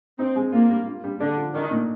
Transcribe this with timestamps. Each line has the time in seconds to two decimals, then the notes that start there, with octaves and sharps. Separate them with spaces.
0.19 C4 D#4
0.36 G#3
0.52 A#3 F4
0.70 G3
0.87 F4
1.04 G3
1.20 D3 D4
1.37 F3
1.54 D#3 D4
1.71 A#2